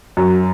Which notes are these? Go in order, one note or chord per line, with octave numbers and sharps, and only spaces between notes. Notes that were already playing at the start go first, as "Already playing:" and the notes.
F#2